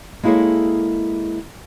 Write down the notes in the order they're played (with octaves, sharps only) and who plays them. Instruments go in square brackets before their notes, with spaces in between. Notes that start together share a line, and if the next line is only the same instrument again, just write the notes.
[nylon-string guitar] G#3 A#3 E4 G#4 A4 C#5